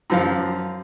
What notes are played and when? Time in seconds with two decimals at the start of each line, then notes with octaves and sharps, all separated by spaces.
0.10 F#2 F3 F5